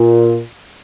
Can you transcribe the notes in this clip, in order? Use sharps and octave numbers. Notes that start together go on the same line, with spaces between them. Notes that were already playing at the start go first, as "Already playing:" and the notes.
Already playing: A#2